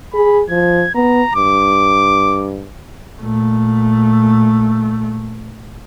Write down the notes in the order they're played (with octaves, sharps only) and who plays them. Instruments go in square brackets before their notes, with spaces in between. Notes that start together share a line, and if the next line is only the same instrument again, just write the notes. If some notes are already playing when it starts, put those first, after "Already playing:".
[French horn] G#4 [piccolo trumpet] B5
[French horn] F3 [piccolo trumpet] G#6
[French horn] B3 [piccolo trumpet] A#5
[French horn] G2 [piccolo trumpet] D6
[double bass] A#2 A3